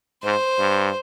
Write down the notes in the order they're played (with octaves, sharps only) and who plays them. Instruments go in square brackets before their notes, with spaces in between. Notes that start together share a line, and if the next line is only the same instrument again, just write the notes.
[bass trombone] G#2 [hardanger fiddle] C5
[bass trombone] G2